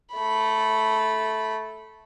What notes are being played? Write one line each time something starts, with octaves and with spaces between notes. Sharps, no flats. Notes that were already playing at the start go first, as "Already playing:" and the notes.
A3 B5